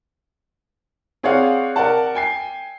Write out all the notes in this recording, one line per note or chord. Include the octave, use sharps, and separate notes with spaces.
C4 G#4 C#5 D5 F5 F#5
A#4 D5 F#5 A5
G5 G#5 C7